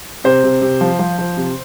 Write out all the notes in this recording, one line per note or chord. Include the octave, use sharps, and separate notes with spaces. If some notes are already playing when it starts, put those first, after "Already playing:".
C3 C5
C3
C3
F3
F3
F3
C3